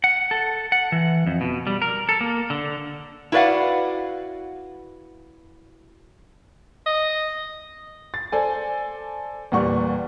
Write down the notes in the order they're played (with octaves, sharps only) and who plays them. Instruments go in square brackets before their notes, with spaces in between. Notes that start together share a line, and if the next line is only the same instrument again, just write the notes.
[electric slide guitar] F#5
A4
F#5
E3
F2
B2
G3
A#4
A4
A#3
D3
[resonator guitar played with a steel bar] E4 F#4 B4 D5 F5 F#5
[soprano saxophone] D#5
[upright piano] A6
A4 C5 D5 G#5
E2 A#2 G3 F#5 C#6